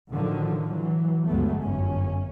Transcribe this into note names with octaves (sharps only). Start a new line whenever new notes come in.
A2 D3 D#3 F3 F#3
E3 F#3
D2 G2 F#3 G#3 A3 B3
G1 F#2 C#4